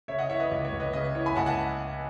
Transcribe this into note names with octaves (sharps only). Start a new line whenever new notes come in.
C#3 C#5 E5
D#5 F#5
E3 C#5 E5
B4 D#5
C#2
C#5
C#2
B4 D#5
C#3 B4 D#5
E3 C#5
G#5 B5
C#2 F#5 A5
F#5 A5